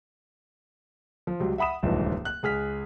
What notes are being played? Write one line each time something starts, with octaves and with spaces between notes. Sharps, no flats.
F3
C#2 F#3 G3
E5 F#5 B5 D#6 E7
D#1 C#2 G2 E3 F3 D#4
F#6
C#2 G#4 F6 B6